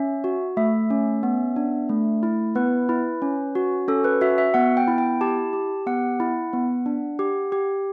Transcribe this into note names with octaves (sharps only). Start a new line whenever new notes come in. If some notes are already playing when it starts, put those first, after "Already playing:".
Already playing: C#4 E5
F#4
A3 E5
C#4
B3
D4
A3
E4
B3 B4
E4
C#4
F#4
C#4 A4
B4
F#4 E5
E5
B3 F#5
G5
E4
G5
G4 A5
G4
B3 F#5
E4
B3
D4
G4
G4